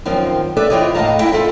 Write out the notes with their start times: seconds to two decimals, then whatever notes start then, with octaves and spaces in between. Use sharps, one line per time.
0.05 F#2 D#3 F3 C4
0.57 G4 A4 B4 D5 E5
0.70 E3 C4 F4 G4 C#5 D#5
0.94 A2 D#5 F5 A5 A#5
1.19 E2 E4 E5 G5 A5
1.32 F4 A4 E5